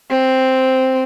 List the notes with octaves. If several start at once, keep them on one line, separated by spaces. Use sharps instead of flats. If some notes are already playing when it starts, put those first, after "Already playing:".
C4